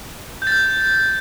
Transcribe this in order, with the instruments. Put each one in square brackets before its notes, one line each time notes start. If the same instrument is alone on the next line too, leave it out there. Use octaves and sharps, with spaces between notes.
[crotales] G6
A6
G6